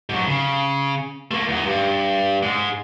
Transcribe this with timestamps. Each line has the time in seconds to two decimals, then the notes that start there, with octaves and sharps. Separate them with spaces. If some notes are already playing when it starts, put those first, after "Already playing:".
0.10 G#2 F#3
0.27 C#3
1.31 A3 A#3
1.49 E2 D#4
1.65 G2
2.43 G#2 G#3